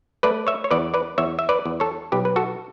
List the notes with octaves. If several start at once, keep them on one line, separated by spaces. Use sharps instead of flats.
A3 B4 D5
C#5 E5
C#5
E2 B4 D5
B4 D5
E2 C#5 E5
E5
B4 D5
E2
A4 C#5
B1 G4 B4
B4
F#4 A4